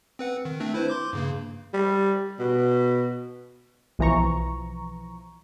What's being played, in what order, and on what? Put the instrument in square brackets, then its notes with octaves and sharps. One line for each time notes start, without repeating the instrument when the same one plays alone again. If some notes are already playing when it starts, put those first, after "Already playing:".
[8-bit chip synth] C4 B4 F#5
D#3
A3 C4 D4
E4 B4 C5
C6 D6 G6
G2 C#3 A#3
[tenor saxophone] G3
B2
[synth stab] B1 E3 F3 A#5 C#6